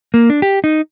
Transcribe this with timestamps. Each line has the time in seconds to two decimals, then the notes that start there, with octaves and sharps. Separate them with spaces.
0.14 A#3
0.30 D4
0.42 G4
0.64 D#4